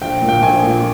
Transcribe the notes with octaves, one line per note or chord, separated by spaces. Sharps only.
A#1 G5
A#2
G5
A#1 G#5
A#2